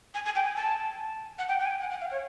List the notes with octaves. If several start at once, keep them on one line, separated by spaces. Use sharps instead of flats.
G#5
G#5
G5
G#5
A5
F#5
G5
G5
G#5
G5
F#5
F#5
F5
C#5